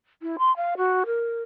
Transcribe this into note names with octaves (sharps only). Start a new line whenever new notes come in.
E4
C6
F5
F#4
A#4